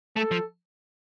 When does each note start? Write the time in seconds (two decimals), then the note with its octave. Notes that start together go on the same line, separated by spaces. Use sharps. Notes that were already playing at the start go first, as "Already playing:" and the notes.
0.17 A3 A4
0.32 F3